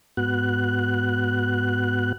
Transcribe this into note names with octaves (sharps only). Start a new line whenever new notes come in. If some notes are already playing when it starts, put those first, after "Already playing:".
G#2 B3 F#4 F#6